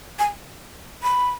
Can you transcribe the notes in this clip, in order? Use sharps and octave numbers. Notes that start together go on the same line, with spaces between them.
G#5
B5